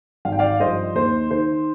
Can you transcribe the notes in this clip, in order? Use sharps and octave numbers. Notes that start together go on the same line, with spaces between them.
G#1 F5
G5
D5 F5
G2 F3 C5 D#5
D#2 C5
D#3 C5